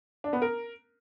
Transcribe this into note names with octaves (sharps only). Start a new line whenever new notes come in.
D4
B3
A#4